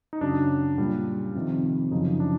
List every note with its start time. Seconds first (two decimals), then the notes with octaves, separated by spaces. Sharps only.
0.13 D#4
0.21 F#2 C#3 F#3 D4
0.78 A#2 G3
1.35 F2 C3 D#3
1.91 F#2 C#3 F3 D#4
2.20 D4